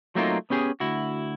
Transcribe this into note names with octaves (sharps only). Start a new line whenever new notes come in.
F#3 A3 A#3 C4 D#4 F4
B3 C#4 G4 G#4
D2 E4 F#4